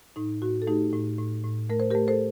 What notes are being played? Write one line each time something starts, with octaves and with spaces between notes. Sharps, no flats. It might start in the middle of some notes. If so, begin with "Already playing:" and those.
A2 D#4
A2 F#4
A4
A3 D#4 G4
A2
A2
A2
A3 A#4
C5
A3 G4 A#4
A4 C5